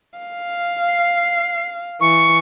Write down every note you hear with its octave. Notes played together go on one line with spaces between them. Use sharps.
F5
C7
E3 C#6